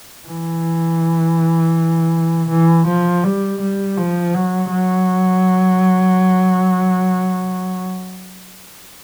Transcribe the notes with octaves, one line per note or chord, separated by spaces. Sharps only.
E3
E3
F3
G3
G3
F3
F#3
F#3